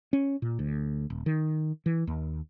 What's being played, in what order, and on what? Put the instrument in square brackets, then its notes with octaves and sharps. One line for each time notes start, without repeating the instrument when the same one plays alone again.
[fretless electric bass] C#4
A#2
D2
D#1
D#3
E3
D#2